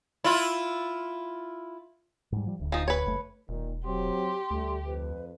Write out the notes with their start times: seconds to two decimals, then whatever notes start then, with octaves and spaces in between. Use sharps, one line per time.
0.24 E4 F4
2.32 G#2 G3
2.46 F3 G3
2.59 D1 D2
2.72 F3 D#4
2.88 B4 C#5
3.06 F#1 A3
3.49 E1 A#2 D#3
3.85 F#3 C4 G4 C6
4.51 D2 G3 A3
4.86 F2 B4